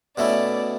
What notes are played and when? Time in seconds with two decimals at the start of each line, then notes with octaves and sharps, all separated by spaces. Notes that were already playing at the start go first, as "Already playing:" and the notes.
0.17 B2 A3 C#4 E4 D5